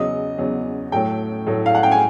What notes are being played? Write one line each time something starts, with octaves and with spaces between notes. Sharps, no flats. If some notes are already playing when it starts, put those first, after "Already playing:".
Already playing: E2 C#3 F#3 D#5
E2 C#3 F#3
A2 F#3 A3 G5
A2 F#3 A3
F5
F#5
G5
G#5